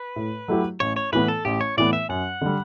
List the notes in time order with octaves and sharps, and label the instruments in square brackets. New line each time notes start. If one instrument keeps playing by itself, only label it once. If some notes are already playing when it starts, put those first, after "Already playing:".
Already playing: [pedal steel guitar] B4
[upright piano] A2
F#3 A3 E4 G4
[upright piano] A1 [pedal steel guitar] C#5
[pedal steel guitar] C#5
[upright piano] A2 E3 B3 [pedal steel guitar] B4
[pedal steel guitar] A4
[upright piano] A1 [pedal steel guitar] G4
[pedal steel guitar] C#5
[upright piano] A2 E3 B3 [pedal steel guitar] D5
[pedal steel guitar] E5
[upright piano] F#2 [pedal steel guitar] F#5
[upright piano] D3 G3